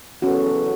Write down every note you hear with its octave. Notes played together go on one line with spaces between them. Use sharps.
E2 C#3 F#3 B3 C#4 F#4 A4